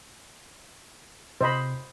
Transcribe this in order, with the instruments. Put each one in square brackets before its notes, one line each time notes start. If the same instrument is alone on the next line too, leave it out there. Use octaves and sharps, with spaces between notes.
[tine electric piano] C3 [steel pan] C5 D#5 B5